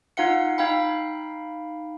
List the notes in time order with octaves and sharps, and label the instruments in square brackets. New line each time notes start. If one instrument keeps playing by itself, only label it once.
[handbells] D#4 F4 F5 F#5 C#7
D#4 F5 G5 B5